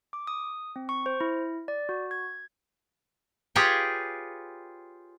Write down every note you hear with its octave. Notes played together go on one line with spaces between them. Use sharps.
D6
D#6
C4
C#6
C5
E4
D5
F#4
G#6
F4 G4 G#4 B4 C#5 G5